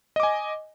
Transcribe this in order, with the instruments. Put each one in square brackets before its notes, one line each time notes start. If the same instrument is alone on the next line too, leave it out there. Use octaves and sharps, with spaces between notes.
[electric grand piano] D#5
D6
G#5